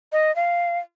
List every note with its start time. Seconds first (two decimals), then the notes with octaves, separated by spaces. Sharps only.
0.12 D#5
0.36 F5